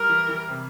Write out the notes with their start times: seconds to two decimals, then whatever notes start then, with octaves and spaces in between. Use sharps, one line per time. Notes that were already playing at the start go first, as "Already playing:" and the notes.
Already playing: G3 A#4
0.09 E3
0.28 E3
0.48 C3